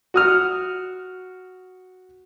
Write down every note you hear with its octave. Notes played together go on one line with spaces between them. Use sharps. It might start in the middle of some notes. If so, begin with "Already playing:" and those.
F#4 D#6 F6